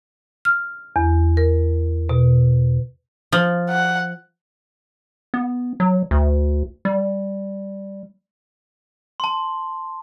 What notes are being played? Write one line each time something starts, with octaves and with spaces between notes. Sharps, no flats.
F6
E2
A#4
B2
F3
F#5
B3
F#3
D2
G3
A5 C6